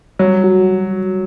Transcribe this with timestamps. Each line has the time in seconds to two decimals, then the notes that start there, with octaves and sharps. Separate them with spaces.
0.19 F#3 G3
0.44 F#4